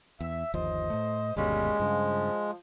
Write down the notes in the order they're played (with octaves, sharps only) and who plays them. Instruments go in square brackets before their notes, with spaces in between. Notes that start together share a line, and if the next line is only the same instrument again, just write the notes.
[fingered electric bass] E2 [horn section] E5
[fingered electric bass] G1 D#2 F3 [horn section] C5 D#5
[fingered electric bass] A2 A3
[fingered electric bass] G1 D#2 B2 [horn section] G3 A#3 C#4 [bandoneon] G#3
[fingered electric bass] G2 C#3 [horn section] F3